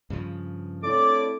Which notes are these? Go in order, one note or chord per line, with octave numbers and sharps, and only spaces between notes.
G2 C#3 F3
A3 C4 D4 E4 C#5 D5 D6